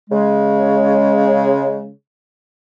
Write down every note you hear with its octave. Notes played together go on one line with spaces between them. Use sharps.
C#3 G#3